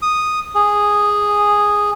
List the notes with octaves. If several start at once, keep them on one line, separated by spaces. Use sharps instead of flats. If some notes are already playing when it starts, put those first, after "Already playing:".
D#6
G#4